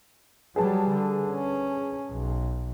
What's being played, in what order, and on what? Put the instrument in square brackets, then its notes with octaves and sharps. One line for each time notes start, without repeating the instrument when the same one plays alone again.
[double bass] F#3 G3 [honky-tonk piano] G#4 B4 A5
[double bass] D3
C#4
B1